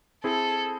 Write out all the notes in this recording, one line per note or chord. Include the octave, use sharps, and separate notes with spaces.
C4 E4 G#4 A4